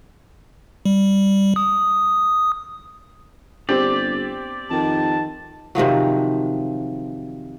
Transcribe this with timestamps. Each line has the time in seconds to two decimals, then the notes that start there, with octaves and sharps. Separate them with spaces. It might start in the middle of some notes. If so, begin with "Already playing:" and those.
0.85 G3
1.56 D#6
3.69 G1 C4 G4 D5
4.70 F2 D#3 A5
5.75 C3 D#3 F3 F#3